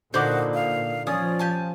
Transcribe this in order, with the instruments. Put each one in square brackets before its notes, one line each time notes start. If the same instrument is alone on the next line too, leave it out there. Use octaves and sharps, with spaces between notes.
[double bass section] A#2 [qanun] D3 D#4 [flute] F#4 [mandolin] C5 B5 D6
[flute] F5
[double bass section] F3 [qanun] C#4 [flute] D5 [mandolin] D#6
[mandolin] G4 G#5 A5